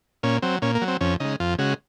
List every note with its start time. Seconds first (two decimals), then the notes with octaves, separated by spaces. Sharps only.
0.23 A#2 C#4
0.42 F#3 C4
0.62 A#2 C#4
0.75 A#3
0.82 F#3
0.88 C4
1.01 F2 C#4
1.20 C#3 G#3 D#4
1.40 F2 F4
1.58 C#3 G#3 F#4